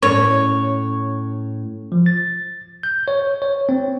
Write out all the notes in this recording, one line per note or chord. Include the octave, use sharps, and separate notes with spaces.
A2 C#4 C#5
F3
A6
G6
C#5
C#5
C4